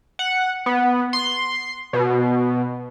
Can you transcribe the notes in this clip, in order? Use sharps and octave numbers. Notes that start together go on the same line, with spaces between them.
F#5
B3
C6
B2